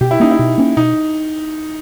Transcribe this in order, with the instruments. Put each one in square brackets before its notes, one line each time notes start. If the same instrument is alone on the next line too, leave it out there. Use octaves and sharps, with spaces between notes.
[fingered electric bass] B2 [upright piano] G4
[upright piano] E4
[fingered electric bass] A#3 C#4 [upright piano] D#4
[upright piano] E4
[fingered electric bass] B2
A#3 C#4
[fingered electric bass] B2 [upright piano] D#4